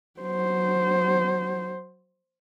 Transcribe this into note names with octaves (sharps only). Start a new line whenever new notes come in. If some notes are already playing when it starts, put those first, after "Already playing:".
F#3 C5